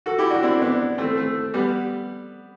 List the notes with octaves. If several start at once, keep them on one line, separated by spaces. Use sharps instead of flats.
F#4 A4
E4 G4
D4 F#4
C4 E4
B3 D4
A3 C4
A3
G3 B3